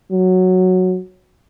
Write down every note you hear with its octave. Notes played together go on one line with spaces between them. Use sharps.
F#3